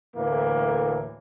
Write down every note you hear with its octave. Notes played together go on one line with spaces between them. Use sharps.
D2 A2 E3 A#3